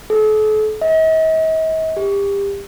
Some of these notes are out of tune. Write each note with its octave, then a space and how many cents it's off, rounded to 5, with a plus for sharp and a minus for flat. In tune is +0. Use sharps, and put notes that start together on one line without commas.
A4 -40
D#5 +45
G4 +30